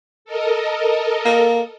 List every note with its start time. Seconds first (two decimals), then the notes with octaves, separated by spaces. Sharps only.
0.25 A4 A#4 D#5
1.25 A#3